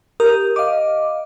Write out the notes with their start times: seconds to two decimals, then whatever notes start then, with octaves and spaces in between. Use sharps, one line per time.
0.20 G4 A#4 D#6
0.56 D#5 F5 D6